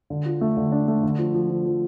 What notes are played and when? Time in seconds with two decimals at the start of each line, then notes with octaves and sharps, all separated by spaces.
0.10 D3
0.25 F4
0.41 A3
0.57 D3
0.72 D4
0.88 A3
1.04 D3
1.19 F3
1.34 F3
1.50 F3
1.66 F3